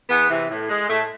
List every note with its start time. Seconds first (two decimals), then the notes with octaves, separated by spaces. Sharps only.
0.09 E2 B3
0.29 C3 E3
0.49 A2
0.69 G#3
0.88 A2 A3